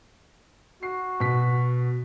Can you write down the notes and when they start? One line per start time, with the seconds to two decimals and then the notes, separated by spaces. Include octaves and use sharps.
0.83 F#4 C7
1.20 B2 B6